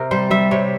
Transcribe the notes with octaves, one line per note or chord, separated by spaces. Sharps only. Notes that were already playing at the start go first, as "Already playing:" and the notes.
Already playing: C3 A#4
G3 C5
G3 E5
C3 C#5